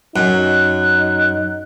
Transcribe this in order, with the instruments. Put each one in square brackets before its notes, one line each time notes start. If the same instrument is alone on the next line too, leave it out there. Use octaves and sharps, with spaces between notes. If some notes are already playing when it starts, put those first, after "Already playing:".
[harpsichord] F#2 [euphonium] D#4 [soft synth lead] F#6